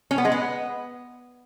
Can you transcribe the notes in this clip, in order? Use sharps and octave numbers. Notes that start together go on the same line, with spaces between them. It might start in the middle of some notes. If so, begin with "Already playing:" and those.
C#4
B3
G#3
B3